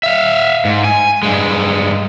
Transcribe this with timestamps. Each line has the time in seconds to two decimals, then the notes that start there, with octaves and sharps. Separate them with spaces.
0.03 E5 F5
0.65 G#2
0.84 G#5
1.23 G2 G#3